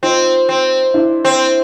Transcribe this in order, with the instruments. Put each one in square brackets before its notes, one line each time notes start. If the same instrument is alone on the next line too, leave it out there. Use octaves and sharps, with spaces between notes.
[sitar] C4 [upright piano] D#4 F4
[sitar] C4
[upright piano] D4 E4
[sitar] C4